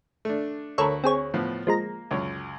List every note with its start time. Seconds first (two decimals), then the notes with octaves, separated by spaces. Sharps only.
0.25 A3 D4
0.78 D2 A4 A#4 C#5 B5 C#6
1.04 C4 G#4 C#5
1.34 A2 F3 B3
1.67 F3 G#3 A#3 A#5
2.11 C#2 F#2 C#5